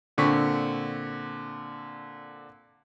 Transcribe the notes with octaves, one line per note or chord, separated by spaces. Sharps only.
A#2 D3 C4 C#6 B6